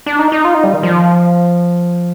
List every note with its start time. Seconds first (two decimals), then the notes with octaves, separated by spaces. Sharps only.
0.06 D4
0.19 D#4
0.32 D#4
0.44 F4
0.54 D#4
0.64 G3
0.73 D#3
0.83 F3